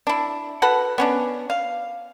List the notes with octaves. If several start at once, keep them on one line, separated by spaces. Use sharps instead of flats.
D4 E4
F#4 A4 B4 F#5
B3 C#4 D4
F5